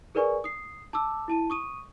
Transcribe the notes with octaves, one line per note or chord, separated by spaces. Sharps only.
G#4 A#4 B4 D5 G#5 C#6
D#6 C7
A5 D6 E6
E4 A5 D#7
C#6 D#6 D#7